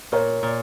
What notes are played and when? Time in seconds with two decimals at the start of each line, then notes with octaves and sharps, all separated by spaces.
0.12 A#2 A#4 C#5
0.43 A#2